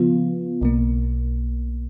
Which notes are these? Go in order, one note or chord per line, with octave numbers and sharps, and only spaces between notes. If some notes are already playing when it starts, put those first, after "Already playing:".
Already playing: C#3 F3 B3 F4
B1 B2 A#3